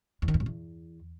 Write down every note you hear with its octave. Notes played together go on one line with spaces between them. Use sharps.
E2
D#3
F2
F#2
E2